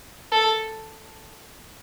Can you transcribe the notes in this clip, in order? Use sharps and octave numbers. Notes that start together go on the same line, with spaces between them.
A4